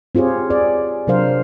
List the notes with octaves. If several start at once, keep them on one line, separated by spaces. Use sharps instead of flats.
C4 F4 G4 G#4 C#5
G#4 D5
C3 F#3 D4 A#4 C5 F5